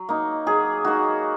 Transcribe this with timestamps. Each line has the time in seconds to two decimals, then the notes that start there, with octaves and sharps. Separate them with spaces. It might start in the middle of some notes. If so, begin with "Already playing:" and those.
Already playing: F#3
0.09 A#3 D#4
0.46 F#3 G#4
0.85 A#3 D#4 F#4